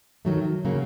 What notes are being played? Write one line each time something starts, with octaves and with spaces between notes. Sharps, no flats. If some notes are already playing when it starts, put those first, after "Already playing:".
D#3 F#3 A3
C#3 F#3 A#3